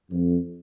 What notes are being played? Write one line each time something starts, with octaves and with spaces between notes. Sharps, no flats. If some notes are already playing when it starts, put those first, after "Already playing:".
F2